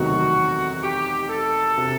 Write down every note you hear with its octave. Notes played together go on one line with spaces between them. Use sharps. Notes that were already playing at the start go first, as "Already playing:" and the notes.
Already playing: E1 D2 C3 D#3 F#3 F#4
G4
A4
C3